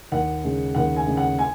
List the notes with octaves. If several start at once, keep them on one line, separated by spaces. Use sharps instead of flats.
D#2 F#5
C#3 G#3
D#2 F#5
G#5
C#3 G#3
F#5
G#5